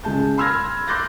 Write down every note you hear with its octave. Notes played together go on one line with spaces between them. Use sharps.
C#2 G#3 A5 G6
B5 C6 E6 F6 G#6 A#6
C6 D6 F#6 G6 A6 A#6